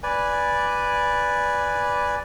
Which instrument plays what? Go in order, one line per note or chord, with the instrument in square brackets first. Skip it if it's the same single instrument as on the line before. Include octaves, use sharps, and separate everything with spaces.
[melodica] B4 D5 G#5